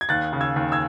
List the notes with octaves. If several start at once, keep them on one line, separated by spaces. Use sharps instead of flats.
G#6
D#2 F#6 A6
C#3
E6 G#6
D#2
E6 G#6